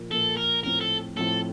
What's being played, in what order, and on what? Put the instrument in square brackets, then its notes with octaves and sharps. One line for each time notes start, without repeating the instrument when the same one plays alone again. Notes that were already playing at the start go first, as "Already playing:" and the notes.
Already playing: [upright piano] A#2 F3 A#3
[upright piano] A#2 F3 A#3 [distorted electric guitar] A4
[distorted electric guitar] A#4
[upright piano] A2 F3 C4 [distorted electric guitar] A#4
[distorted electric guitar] A4
[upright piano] A2 F3 C4 [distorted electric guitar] A4